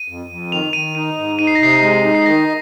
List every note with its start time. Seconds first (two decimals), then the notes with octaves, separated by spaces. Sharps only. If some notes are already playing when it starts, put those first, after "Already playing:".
Already playing: D#7
0.08 F2
0.30 F2
0.51 D#3 F7
0.73 D#3 D#7
0.95 D#4 D#7
1.17 G#2
1.39 D#4 D#7
1.47 C7
1.55 A#6
1.61 C3 C7
1.82 G#3
2.04 D#4
2.15 C7
2.26 D#3 A#6